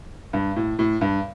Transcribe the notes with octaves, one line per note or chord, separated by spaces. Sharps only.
G2
A2
A2
G2